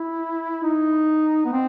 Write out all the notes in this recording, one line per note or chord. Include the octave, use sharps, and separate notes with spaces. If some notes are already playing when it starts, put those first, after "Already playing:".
Already playing: E4
D#4
B3
C4